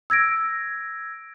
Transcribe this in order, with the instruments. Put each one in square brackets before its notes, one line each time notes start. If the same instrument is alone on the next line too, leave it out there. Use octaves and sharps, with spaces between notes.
[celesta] E6 G#6 A#6 D7